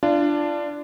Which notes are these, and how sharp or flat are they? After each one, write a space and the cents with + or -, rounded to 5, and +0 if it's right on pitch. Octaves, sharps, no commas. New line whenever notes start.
D4 +0 F4 -35